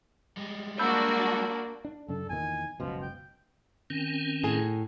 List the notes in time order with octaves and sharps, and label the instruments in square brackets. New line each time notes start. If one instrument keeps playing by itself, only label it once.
[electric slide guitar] G3 G#3
[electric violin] A#3 [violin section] D4 F#4 D5 [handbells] B5 E6 G6
[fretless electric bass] D4
[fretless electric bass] F#2 C#3 D4 [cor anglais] A4
[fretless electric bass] E2 A#2 D#3 [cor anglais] G#5
[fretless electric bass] F#1 C#2 B2 [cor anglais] F3
[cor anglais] G5
[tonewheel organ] D#3 C4 C#4
[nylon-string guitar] A2 G#4 G#5